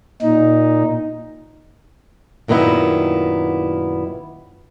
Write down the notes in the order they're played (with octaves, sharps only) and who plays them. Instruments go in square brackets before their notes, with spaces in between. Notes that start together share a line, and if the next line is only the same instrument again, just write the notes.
[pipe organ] A#2 D#4
[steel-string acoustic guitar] F#2 A#2 D#3 B3 E4